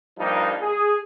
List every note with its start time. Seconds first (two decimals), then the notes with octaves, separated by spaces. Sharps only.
0.19 G2 F3 G3 A#3 D4 D#4
0.61 G#4